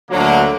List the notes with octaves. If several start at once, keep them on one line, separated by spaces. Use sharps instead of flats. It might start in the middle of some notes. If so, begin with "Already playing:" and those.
D2 D3 F#3 A#3